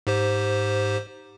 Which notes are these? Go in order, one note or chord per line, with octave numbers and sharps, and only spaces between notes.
G#2 G4 C5